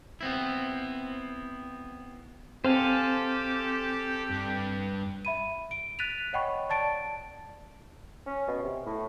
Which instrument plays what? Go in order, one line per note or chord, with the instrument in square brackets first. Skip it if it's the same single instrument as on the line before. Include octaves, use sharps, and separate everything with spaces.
[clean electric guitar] B3 C4 E4
[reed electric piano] C4 [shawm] G4 [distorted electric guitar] A4 [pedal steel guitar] C5 F5 G#5
[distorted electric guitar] G2
[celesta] E5 B5 D#7
D7
F#6 A6 B6 D#7 F7
C#5 D#5 F#5 G5 B5 C#6
D5 A5 A6 D7
[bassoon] C#4
B2
C3
A2